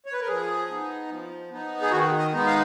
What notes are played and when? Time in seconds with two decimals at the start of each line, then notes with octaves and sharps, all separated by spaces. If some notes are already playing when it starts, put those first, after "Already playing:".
0.06 C#5
0.13 B4
0.21 A#4
0.28 F3 G#4
0.69 B3 D#4
1.09 F3
1.51 B3 D#4
1.82 G#4
1.91 D#3 F#4
2.18 D#5
2.33 G#3 B3 D#4
2.47 F5